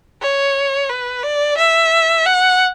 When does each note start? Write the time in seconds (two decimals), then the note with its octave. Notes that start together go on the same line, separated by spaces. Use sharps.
0.21 C#5
0.89 B4
1.24 D5
1.58 E5
2.26 F#5